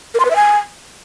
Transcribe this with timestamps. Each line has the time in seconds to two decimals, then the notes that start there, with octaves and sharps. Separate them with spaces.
0.14 A#4
0.20 C6
0.25 B4
0.30 E5
0.36 G#5